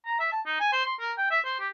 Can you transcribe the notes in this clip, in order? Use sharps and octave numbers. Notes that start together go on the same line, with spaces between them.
A#5
E5
A5
D#4
G#5
C5
C6
A#4
G5
E5
C5
G4